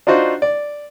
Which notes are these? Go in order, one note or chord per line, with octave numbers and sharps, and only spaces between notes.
D4 D#4 F4 F#4 C5
D5